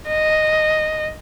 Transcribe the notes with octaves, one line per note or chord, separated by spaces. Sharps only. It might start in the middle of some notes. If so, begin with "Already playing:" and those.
D#5